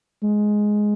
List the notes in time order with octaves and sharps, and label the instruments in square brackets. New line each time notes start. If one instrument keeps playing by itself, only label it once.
[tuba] G#3